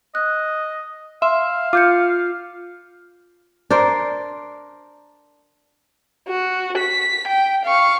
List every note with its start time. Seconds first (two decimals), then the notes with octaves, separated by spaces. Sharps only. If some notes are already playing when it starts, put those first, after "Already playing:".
0.15 D#5 F#6
1.22 E5 F5 C6
1.73 F4 D6 G6 C#7
3.70 D4 A#4 C5
6.29 F#4
6.78 B6
7.28 G5
7.66 F5 C#6